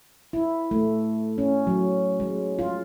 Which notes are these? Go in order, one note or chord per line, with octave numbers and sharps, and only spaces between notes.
E4
A3
C#4
F#3
G#3
F4